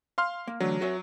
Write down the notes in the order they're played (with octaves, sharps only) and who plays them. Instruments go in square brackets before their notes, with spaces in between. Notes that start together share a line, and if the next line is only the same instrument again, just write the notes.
[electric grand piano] F5 C6 F6
[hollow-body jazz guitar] A#3
[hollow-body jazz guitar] D3 E3 A3 [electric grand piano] F#3
[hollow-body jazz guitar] F#4 C#5 E5